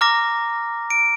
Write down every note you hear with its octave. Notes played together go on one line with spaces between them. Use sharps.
A#5 D6 F6 A#6
D7